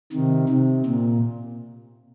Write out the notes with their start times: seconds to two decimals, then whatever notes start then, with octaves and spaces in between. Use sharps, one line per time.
0.13 C3 D#3
0.49 C3
0.86 A#2